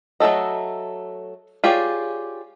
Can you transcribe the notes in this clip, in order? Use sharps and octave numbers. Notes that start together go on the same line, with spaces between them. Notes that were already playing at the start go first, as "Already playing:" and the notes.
F#3 A3 D4 A4 D#5
F4 G4 G#4 C#5 D5